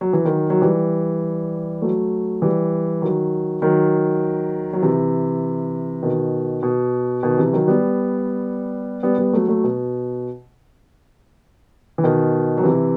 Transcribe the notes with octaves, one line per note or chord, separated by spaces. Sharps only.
F#3
E3
D#3 F#3
F#3
E3 G3
F#3 A3
E3 G3
D#3 F#3
D#3 F#3
F#3
C3 E3
B2 D#3
B2
B2 D#3
C3 E3
D#3 F#3
G3 B3
G3 B3
G3 B3
F#3 A3
F#3 A3
B2
E3
B2 D#3
F#3
C3 E3